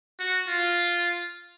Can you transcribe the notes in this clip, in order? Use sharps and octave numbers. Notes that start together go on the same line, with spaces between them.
F#4
F4